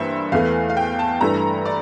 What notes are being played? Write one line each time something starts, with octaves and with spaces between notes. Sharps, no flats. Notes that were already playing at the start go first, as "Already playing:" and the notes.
Already playing: G2 E3 A#3 C5 E5
E2 E3 A3 F5
F5
G5
A5
G2 E3 A3 E4 A#5
D5